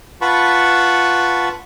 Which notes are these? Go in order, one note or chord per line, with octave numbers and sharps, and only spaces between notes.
F4 B4 F#5 A5 B5 C#6